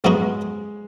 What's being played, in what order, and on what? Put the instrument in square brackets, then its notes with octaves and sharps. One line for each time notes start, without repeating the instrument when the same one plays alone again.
[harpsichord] G#2 F#3 B3 D#4 F#4 [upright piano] G#3